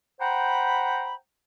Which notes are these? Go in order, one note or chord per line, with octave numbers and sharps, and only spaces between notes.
C5 F#5 G5 A#5 B5